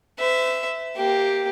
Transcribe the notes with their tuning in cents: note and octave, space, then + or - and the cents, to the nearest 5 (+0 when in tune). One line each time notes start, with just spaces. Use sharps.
C5 -45 E5 +0
A#3 +0 G4 +0